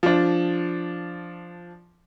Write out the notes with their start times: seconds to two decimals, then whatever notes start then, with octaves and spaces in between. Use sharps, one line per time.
0.03 F3 D4